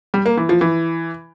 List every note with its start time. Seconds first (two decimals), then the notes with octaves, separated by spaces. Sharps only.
0.14 G3
0.26 A#3
0.37 E3
0.49 F3
0.61 E3